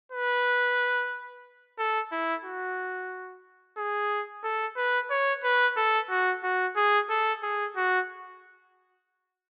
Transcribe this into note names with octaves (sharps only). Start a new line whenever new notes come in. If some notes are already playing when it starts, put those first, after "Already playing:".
B4
A4
E4
F#4
G#4
A4
B4
C#5
B4
A4
F#4
F#4
G#4
A4
G#4
F#4